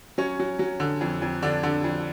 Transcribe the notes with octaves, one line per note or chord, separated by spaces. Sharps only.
F#3 C#4
F#3
F#3
D3
F2
F2
D3 D4
D3
F2